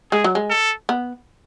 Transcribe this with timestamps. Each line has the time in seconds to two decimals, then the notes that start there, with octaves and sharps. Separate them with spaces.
0.12 G#3 G#4
0.24 F#3
0.35 G#3
0.50 A4
0.89 B3